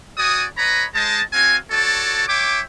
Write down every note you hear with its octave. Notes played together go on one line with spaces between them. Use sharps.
F#4 D5 G#5 D#6
B4 C#5 D#5 A#5 B5
G#3 C5 D#5 A5
C4 F#4 F5 G#5
F#4 A4 C#5 D5 A5
C#5 E5 G5 D6